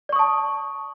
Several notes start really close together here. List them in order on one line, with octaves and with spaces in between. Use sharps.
D5 C#6 D#6 A5